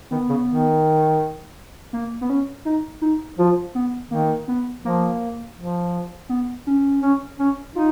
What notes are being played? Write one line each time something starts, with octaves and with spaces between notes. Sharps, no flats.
D#3 B3
C#3
D#3
A#3
B3
C#4
D#4
D#4
F3 F4
B3
D#3 A#3
B3
F3 A#3
F3
B3
C#4
C#4
C#4
D#4 F4